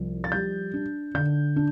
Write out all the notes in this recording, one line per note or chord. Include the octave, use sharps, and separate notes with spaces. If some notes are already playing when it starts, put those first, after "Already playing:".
Already playing: C2 F3
A6
G3 G6
D4
D3 G6
D4